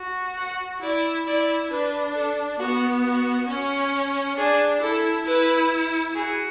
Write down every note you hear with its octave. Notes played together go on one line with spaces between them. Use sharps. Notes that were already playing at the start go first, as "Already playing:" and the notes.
Already playing: F#4
F#5
E4 D5
E4 D5
D4 B4
A4
B3 F#4
F#4
C#4
D4 G#4
E4 A4
E4 B4
F#4 G#4